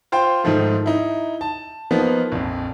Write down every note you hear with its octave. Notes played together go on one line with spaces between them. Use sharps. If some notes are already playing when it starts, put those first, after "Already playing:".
F4 C5 G5
G#2 D#3 F3 A3
D#4 E4
A5
F3 A#3 B3 D#4
A#1 F2